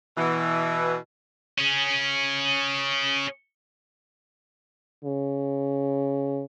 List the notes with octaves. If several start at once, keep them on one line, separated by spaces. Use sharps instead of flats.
B2 E3
C#4 G#4
C#3